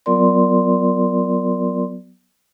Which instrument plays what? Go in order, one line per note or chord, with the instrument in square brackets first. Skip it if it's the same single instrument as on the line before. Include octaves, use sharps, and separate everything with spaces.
[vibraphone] F#3 B3 F4 A#4 D5 C6